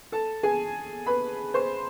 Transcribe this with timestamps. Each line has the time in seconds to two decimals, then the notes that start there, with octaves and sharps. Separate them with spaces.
0.12 A4 A5
0.43 G#4 G#5
1.07 B4 B5
1.54 C5 C6